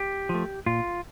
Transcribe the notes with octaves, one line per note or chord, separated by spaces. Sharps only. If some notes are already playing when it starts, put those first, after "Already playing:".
Already playing: G4
F3 A3
A#2 F4